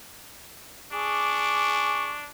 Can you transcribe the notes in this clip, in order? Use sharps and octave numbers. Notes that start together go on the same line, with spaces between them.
D4 G#4 C#6 D6